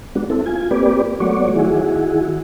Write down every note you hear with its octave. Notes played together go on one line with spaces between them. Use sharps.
G#3 B3 D4 F#4
C4 E4 A4
F4 G#5
A#3 C4 G4 B4 D5
F#3 A3 B3 F#4 C#5 D5
D#3 E4 F#4 G#4